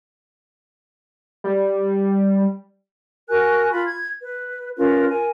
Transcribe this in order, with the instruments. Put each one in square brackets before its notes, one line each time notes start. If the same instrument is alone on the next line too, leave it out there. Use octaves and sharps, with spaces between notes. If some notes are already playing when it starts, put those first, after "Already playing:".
[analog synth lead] G3
[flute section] F#4 A#4 G#5 F#6
F4 B5
G#6
B4
C#4 F4 A#4 B4
A#4 G#5